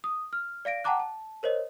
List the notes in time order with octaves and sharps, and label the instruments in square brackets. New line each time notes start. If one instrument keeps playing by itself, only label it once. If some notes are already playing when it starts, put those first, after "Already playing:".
[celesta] D#6
F6
D5 F5 A#6 D7
F#5 G5 A5 A#5 D6 F#6
A5
A#4 C5 C#5 D#5